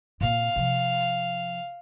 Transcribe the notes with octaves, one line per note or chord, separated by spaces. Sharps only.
A#2 C4 F5
C3 F3